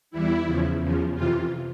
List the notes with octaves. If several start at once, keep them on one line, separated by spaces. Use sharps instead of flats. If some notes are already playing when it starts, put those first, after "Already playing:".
E2 E3 G3 E4
E2 C#3 F3
E2 C#3 F3
F2 C3 E3 F4